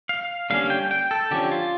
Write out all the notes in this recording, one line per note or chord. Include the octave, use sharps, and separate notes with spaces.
F5
D3 G3 A#3 C#4 F5
G5
G5
A4
D3 F3 C#4 G4
F4